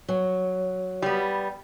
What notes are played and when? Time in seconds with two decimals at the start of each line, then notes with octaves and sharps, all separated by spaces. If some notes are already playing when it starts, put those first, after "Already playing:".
0.09 F#3
1.02 G3 B3